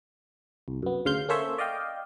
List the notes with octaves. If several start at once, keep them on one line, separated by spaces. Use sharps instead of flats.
C2
F#2 B3
D2 C#3 F5 C6 G6
A#3 C#4 A4 C5 C#5 E5
D5 D#5 F5 G5